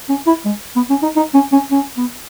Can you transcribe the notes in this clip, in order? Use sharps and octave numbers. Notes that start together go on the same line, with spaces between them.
C#4
E4
G#3
B3
C#4
D#4
D#4
C#4
C#4
C#4
B3